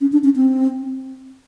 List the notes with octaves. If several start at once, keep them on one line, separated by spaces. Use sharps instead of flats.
C#4
D4
C#4
C4